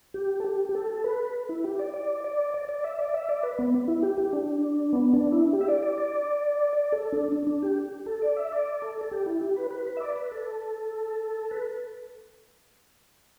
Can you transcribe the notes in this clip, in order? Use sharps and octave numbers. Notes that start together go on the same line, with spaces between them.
G4
A4
G4
G4
A4
B4
E4
G4
D5
D5
D5
D5
D5
E5
D5
E5
D5
B4
B3
E4
G4
G4
D4
B3
D4
E4
G4
E5
D5
D5
D5
D5
A4
D4
D4
D4
G4
A4
D5
E5
D5
A4
A4
G4
E4
G4
B4
B4
B4
E5
D5
B4
A4
B4